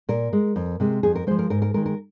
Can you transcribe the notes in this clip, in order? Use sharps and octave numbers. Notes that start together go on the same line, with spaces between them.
A#2 A#4
G#3
F2
C3 G#3
F2 G#4
A#4
F3 G#3 C5
A#4
G#2 A#4
A#4
D#3 G#3 A#4
A#4